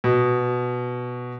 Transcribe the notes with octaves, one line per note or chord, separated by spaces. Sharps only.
B2